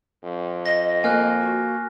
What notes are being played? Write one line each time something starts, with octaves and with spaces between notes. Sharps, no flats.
F2
D#5 A#6
A#3 G#5 F6 F#6
F#4